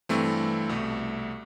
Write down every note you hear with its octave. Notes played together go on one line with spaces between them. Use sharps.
G2 E3 A3 C4
C2 B2 A3